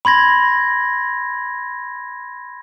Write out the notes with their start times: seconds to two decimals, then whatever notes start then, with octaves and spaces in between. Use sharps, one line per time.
0.05 B5 C6 G#6 A#6